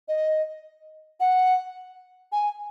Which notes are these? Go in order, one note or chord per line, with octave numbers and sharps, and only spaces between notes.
D#5
F#5
G#5